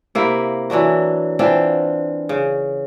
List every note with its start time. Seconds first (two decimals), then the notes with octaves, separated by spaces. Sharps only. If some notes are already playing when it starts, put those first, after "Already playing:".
0.15 C3 A#3 E4
0.70 E3 F#3 D4 F#4
1.39 E3 C4 D4 F4
2.29 C#3